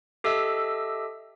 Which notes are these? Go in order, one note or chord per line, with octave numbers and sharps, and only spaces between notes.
G4 A4 D#5 E5 E6